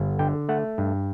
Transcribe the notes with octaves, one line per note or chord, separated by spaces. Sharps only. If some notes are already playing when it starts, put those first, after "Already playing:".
Already playing: G1
D3 G5
A3 F#5
G2